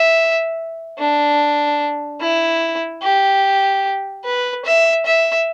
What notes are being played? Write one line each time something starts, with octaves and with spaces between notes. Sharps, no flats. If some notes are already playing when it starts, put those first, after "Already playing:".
Already playing: E5
D4
E4
G4
B4
E5
E5